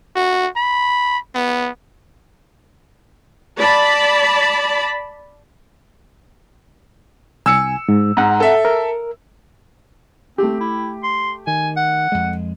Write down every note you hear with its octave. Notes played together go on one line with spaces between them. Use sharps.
F#4
B5
B3
D5 A5 B5
C2 G#5 E6 C#7
G#2
G#2 F#5 A#5
A4 E5
A#4
A3 C4 G4
E4
C6
D#3 G#5
F#5
F2 G#3